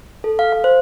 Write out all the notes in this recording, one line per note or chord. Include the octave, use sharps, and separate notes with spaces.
A4
F5
F5
C5